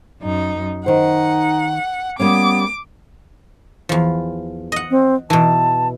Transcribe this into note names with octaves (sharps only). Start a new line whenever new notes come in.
F#2 D#4
D#3 D#4 C5 F#5
G3 A#3 B3 C#4 D6
E2 F3
D#5 F#5
C4
B2 E3 A5